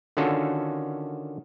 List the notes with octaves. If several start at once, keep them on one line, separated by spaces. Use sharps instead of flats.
D3 D#3 C#4 F4 F#4 A4